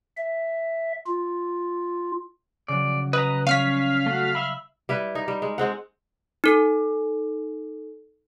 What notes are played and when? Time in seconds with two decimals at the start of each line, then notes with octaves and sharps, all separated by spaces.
0.17 E5
1.07 F4
2.68 C#3 F#3 D5
3.13 B4 D#5 A#5
3.47 G3 C#4 C#5 F5 F6 B6
4.06 A3 F#4
4.35 E5 B5
4.89 G3 E4 B4
5.15 D#4
5.28 G3
5.42 G#3
5.58 G#3 C4 F#5
6.44 D#4 A4